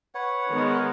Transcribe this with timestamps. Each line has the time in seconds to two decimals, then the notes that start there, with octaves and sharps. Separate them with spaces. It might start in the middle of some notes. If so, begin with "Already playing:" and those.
0.15 B4 C#5 F#5
0.51 D#3 G#3 B3